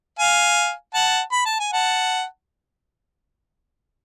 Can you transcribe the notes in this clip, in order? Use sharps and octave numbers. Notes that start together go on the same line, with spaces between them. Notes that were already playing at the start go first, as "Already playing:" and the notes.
F5 G#5
F#5 A5
B5
A5
G#5
F#5 A5